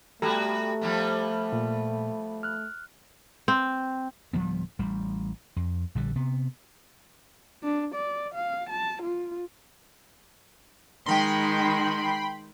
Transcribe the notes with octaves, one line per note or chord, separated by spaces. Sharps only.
G3 A3 B3 F#4 G4 A4 A#5
F3 G3 B3
A#2
F6 F#6
C4
D1 F3 G3 B3
A1 G3
F2
A#1 D3 G3
C3 B3
D4
D5
F5
A5
F4
D#3 G#3 G5 B5 C6